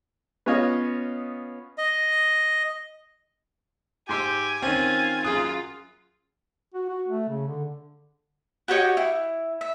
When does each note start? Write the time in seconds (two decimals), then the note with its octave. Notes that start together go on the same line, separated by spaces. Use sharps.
0.46 B3 C#4 F4 C#5 D#5 F5
1.78 D#5
4.09 G#2 G4 G#5 C6 E6
4.62 D#3 C4 C#4 F4
5.25 F#2 F4 G#4 D#6 F#6
6.74 F#4
6.89 F#4
7.08 A3
7.29 C#3
7.47 D3
8.68 F#4 G4 C#5 D#5
8.97 E4
9.61 E5